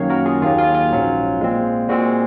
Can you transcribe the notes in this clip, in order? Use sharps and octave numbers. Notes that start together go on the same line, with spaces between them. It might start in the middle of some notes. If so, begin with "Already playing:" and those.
Already playing: F#2 D#3 F#3 A#3 C#4 C#5 F5
F#4 A#4
F4 G#4
D#2 D#3 F#3 A#3 F4 G#4
F4
F4
A#1 G#2 F#3 C#4
A#2 G#3 C4
A#2 G#3 C4 F#4